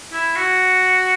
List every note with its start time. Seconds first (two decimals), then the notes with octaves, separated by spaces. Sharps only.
0.12 E4
0.36 F#4